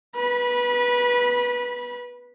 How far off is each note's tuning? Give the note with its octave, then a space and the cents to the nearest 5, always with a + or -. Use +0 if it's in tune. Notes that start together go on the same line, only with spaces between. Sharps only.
B4 -15 B5 -30